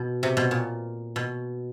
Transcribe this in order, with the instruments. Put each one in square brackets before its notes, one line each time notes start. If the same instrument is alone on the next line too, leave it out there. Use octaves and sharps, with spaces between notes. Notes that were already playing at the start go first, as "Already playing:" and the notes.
Already playing: [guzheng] B2
C3
B2
A#2
B2